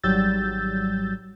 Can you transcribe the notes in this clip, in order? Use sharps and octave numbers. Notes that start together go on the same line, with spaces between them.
G#1 F#3 G3 E6 G6 A6